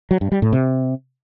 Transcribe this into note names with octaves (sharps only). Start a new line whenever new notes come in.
F#3
G2
G3
A2
C3